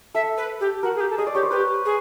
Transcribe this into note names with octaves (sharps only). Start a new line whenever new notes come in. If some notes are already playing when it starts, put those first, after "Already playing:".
A4 E5
B4
G4
F#4 A#4
G#4
G4
A4
G#4 D#5
D5
G4 C#5
C5
G4 B4
G#4